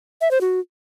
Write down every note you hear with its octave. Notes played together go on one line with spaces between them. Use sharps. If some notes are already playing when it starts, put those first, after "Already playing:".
E5
C5
F#4